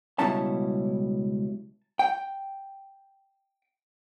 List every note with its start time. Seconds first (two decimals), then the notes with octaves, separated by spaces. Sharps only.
0.19 C#2 B2 G3 C#4 E4 A5
1.99 G5